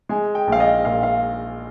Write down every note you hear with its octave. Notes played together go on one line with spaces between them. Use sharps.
G#3 G#5
G5
A#1 F5
D#5
A#2 F5
F5